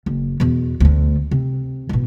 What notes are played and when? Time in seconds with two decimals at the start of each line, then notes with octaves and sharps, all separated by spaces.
0.06 F#1
0.40 E2 B2
0.80 D2 A3
1.31 C3
1.89 A1 B2